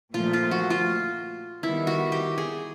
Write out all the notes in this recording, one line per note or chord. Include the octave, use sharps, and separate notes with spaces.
A#2 F3 A3 F4
F4
F#4
F4
D#3 G3 B3 E4
F#4
G4
G#4